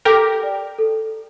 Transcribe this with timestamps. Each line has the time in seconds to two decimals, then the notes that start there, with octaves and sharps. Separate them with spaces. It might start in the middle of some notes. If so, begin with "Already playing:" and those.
0.05 G4 A4 A#4
0.42 D5 G5
0.79 A4